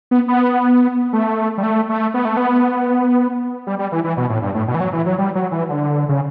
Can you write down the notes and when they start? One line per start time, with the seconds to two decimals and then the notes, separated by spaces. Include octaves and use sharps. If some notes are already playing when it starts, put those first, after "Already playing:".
0.11 B3
0.28 B3
1.13 A3
1.58 G3
1.63 A3
1.90 A3
2.14 B3
2.25 A3
2.37 B3
3.67 G3
3.79 G3
3.92 E3
4.04 E3
4.17 B2
4.30 A2
4.42 G2
4.55 A2
4.68 B2
4.75 E3
4.80 F#3
4.93 E3
5.06 F#3
5.18 G3
5.35 F#3
5.52 E3
5.69 D3
6.09 C#3